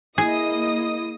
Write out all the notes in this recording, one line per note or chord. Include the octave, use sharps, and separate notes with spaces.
A#3 E4 G#4 D#5 D#6